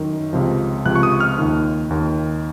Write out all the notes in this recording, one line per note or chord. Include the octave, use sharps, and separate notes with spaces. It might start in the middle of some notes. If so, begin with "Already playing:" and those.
Already playing: F#2 D#3
C#2 C3 F3
C#2 C3 F3 F#6
C#6
D#6
F6
D#2 D#3
D#2 D#3